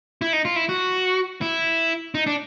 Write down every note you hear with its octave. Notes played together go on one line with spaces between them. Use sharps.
E4
D#4
F4
E4
F#4
E4
D#4
D4